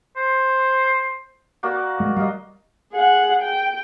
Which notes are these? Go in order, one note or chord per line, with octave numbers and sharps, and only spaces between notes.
C5
A#3 F#4 D5
G#3
G3 D#5 F5
G#4 F#5
G5